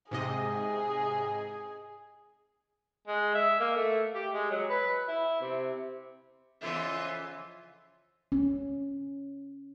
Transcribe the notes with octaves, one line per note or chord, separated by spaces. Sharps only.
G#2 C3 G#4 D#5
G#3
E5
A#3
A3
G4
G#3
F#3
B4
E4
C3
F2 C#3 E3 F4 E5 G#5 C6
C#4